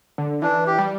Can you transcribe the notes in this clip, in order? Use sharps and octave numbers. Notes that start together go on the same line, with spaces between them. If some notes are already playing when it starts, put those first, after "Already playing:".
D3
E3 D4
G4
G3